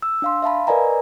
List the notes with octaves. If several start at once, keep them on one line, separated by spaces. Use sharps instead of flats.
E6
D4 F5 C6
E5 F5 A5 B5
A#4 B4 D5 D#5 G#5 A#5